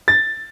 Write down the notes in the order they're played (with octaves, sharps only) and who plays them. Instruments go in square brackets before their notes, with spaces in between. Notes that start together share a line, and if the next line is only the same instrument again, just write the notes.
[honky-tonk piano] A6